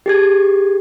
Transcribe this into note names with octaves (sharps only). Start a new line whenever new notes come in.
G4 G#4 G#6